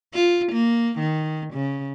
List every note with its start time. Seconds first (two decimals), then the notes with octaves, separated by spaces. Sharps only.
0.14 F4
0.52 A#3
0.99 D#3
1.54 C#3